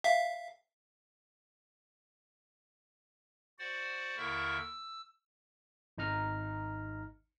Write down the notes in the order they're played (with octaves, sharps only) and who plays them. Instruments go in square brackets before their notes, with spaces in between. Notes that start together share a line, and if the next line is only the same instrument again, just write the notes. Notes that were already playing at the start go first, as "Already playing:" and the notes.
[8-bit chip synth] E5 F5
[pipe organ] F#4 C5 D5 F#5
D#2 D3 E4 A#4 E5 C#6
E6
[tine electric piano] G#1 D#4 A#5 F6